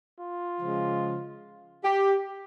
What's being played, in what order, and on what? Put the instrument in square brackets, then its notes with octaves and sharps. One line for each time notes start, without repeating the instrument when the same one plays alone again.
[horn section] F4
C#3 F3 G#3
G4